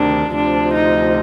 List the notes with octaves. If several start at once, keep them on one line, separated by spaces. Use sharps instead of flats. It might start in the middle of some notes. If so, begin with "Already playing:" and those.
Already playing: D2 C3 D#3 D4
D2 C3 F3 D4
D#4